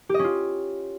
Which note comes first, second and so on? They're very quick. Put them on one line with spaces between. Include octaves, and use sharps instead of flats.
G4 D#5 C#4 F4